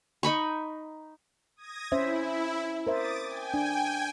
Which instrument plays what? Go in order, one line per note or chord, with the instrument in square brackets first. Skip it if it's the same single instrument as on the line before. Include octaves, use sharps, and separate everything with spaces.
[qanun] D#4 D#5 B5 C#6
[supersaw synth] D#6 G#6 A#6
[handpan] C#4 C5 E5 [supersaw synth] E4
[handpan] A#4 C5 E5 [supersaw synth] D6 D#6 A6
[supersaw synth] G5 G#5
[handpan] D4